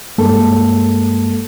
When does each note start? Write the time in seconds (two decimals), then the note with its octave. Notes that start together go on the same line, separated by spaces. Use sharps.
0.18 G2 G#3 A#3 A4